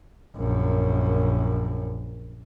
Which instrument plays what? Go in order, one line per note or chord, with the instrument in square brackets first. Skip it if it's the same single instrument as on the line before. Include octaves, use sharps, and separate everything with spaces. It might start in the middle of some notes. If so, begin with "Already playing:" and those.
[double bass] A#1 F#2